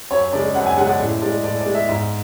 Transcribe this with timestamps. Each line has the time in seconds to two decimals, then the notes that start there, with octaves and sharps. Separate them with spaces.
0.11 F#2 C#5
0.33 C#3 G#3 D5
0.55 F#2 F#5
0.66 G#5
0.77 G#3 F#5
0.81 C#3
0.89 D5
1.01 A2
1.22 G#3 D5
1.44 A2 D5
1.59 D5
1.66 G#3
1.75 E5
1.89 G#2